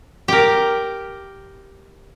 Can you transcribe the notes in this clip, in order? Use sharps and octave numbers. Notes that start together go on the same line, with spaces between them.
G4 A#4